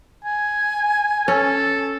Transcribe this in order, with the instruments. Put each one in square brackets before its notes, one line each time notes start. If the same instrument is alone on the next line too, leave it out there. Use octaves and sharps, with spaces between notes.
[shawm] G#5
[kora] C#4 [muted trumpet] A4